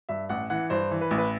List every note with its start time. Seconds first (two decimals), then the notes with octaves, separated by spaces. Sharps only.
0.09 G2 E5
0.29 A1 F#5
0.50 E3 F#5
0.70 G2 C5
0.91 E3
1.01 B4
1.11 A1
1.18 B4